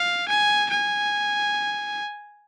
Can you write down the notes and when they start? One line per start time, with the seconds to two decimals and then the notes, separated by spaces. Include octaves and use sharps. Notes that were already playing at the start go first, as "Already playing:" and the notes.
Already playing: F5
0.29 G#5
0.70 G#5